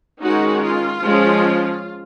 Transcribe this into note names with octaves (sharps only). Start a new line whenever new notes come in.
D#3 G#3 C#4 D#4 F#4
F4
F3 G#3 C#4